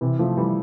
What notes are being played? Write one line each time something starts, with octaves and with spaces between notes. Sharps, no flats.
C3 E3
F3 A3
E3 G3